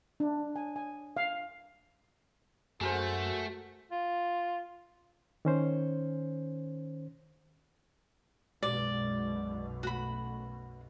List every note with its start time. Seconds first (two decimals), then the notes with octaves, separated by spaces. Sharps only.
0.20 D4
0.56 G#5
0.76 G#5
1.17 F5
2.81 F#2 A3 F#4 G#4 A#4 C5
3.91 F4
5.45 D#3 C#4 C5
8.63 B1 F#2 B2 G#3 D5
9.83 A3 F#4 B5